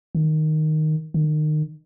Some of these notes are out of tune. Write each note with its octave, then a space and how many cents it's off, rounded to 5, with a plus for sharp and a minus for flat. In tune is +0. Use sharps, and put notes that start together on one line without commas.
D#3 -5
D#3 -30